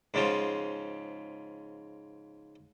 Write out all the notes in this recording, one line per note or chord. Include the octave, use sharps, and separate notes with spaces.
G#2 C#3 F3